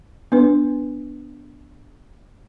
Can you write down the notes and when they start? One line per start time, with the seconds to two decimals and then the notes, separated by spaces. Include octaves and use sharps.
0.32 B3 D4 B4